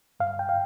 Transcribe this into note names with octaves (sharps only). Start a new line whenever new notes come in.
G2 F5
G5
F5